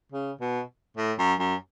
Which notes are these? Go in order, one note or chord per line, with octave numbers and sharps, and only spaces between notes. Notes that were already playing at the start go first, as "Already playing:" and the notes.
C#3
B2
A2
F#2
F#2